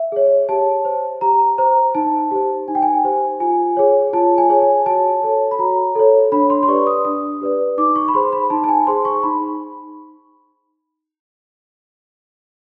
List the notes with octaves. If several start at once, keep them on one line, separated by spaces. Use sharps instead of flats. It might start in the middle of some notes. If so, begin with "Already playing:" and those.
Already playing: E5
G#4 C#5
G4 A5
C5
G4 A#5
C5 A#5
D#4 A5
G4 C5
D#4 G#5
G5
G#5
G4 C5
F4 G#5
G#4 C#5
F4 A5
G#5
G#4 C#5
G#5
F#4 A5
A4 C#5
B5
F#4 A#5
A4 C#5
D4 B5
C6
C6
G4 B4 D5 C#6
D#6
D4 D#6
G4 B4 D5
D#4 D6
C#6
B5
G#4 C5 C6
B5
D#4 A5
A5
G#5
G#4 C5 C6
C#6
D#4 B5